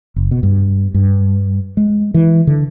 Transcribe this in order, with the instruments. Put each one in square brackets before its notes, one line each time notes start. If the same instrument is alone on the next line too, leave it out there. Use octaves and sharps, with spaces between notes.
[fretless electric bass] F#1
B2
G2
G2
G#3
E3
D3